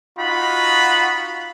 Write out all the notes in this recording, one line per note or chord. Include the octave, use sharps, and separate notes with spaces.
D#4 F4 F#4 B5